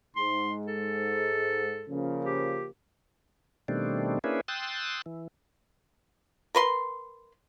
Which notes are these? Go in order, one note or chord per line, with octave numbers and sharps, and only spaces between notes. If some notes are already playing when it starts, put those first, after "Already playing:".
G#2 C6
A4
C#3 F3 A#3
G4
B2 D#3 G3 A3 C4 D4
A#3 C#4 D4 E4 G#4 B4
G5 C6 D#6 E6 F#6 A6
E3
A#4 B4 C6